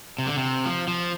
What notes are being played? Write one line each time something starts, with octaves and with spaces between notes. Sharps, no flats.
C3
D3
C3
F3
F3